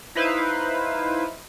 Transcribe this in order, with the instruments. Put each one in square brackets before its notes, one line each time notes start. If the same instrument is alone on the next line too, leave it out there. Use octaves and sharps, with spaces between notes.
[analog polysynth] D#4 E4 B4 C5 F5